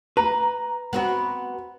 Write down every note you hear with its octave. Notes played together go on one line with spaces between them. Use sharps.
B4 A#5
B3 C4 F#4